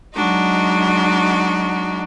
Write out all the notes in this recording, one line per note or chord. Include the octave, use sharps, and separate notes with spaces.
F#3 G#3 D4 D#4 F#4